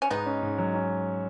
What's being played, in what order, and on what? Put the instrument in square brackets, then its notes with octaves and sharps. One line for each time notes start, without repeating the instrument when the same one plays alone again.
[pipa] C#4
[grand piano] G#2 [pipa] B3 D#4
[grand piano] C#4
G#2
F#3
C#4